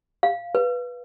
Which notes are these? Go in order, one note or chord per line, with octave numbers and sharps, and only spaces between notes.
F5
B4